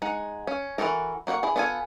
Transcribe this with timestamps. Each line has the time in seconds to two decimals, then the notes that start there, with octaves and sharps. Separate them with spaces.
0.02 G#3 D#4 F#5
0.47 C#4
0.78 E3 A3 F#4 A4 A#4
1.27 A#3 F#4 C5 F#5
1.43 E4 G#4
1.56 B3 D4 F4 A4 G#5